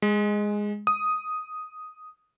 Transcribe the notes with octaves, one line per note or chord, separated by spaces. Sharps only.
G#3
D#6